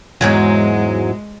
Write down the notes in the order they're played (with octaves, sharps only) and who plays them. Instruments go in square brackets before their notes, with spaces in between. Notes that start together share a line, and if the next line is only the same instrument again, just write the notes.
[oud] E2 G#2 F#3 [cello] G#3